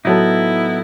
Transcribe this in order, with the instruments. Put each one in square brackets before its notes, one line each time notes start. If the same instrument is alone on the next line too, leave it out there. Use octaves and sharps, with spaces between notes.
[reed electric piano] A2 F#3 A4 [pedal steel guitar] B3 D#4 [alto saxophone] E4